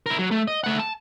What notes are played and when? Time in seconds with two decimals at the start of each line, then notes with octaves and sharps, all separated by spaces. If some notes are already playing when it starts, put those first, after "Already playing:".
0.06 E4 A#4
0.19 F#3
0.31 A3
0.48 D#5
0.64 A3 F#5
0.79 A5